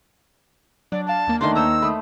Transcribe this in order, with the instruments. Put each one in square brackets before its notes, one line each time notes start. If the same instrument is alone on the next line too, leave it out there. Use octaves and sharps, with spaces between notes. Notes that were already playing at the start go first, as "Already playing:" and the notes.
[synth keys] F#3 [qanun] D4 [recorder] D5
[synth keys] D5 F5 [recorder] A5
[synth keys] D#2 A#3
[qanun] D#3 A3 D4 [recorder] C6
[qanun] C5 C#5 A#5 [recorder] E6
[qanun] A3 [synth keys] B5 D#6